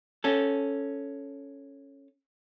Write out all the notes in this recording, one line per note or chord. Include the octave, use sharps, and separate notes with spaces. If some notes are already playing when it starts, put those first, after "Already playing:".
C#4 A4